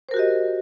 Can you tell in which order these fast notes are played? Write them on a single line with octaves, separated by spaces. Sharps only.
C5 A#4 F#4 G4 D#5